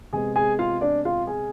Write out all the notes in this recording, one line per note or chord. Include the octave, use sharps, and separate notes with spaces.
C3 G#3 B3 G#4 G#5
G#4 G#5
F4 F5
D4 D5
F4 F5
G#4 G#5